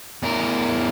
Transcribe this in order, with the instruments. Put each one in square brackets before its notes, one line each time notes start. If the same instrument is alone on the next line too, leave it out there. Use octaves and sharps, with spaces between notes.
[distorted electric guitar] E2 A#4